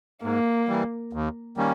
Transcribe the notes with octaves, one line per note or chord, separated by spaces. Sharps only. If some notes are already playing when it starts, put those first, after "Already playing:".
G#2 A#3
E3 G3
D#2
D#3 G3 A#3 C#4